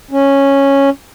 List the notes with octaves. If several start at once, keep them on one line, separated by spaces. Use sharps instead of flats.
C#4